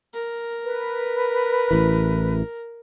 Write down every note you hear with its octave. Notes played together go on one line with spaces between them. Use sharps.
A#4
B4
A1 E3